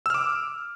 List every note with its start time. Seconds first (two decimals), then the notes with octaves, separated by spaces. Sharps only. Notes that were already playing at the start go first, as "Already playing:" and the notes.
0.06 E6
0.10 F6
0.14 D6